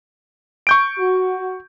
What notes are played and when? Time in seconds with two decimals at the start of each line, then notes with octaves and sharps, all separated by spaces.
0.67 C#6 G6 D7
0.98 F#4